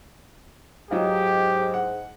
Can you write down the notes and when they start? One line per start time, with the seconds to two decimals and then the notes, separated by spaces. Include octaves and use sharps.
0.91 G#2 F#3 D#4 F4 G4
1.74 F#5